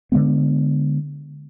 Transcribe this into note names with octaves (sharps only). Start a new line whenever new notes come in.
D3 F#3 G#3 B3